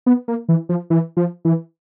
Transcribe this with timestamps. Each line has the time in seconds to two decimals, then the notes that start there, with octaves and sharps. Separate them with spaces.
0.06 B3
0.28 A#3
0.49 E3
0.69 F3
0.90 E3
1.17 F3
1.45 E3